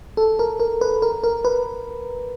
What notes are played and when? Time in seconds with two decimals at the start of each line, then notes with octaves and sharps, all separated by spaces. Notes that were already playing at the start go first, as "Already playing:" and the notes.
0.17 A4
0.39 A#4
0.60 A#4
0.81 B4
1.02 A#4
1.24 A#4
1.45 B4